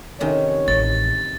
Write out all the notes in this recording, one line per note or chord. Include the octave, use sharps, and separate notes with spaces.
C3 D#3 C#4 C#5
A1 A6